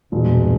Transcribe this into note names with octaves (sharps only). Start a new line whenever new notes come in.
E1 G2 A#2